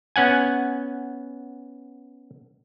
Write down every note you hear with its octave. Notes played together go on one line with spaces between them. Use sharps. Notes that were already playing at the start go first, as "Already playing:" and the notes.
B3 C#4 F#5 G#5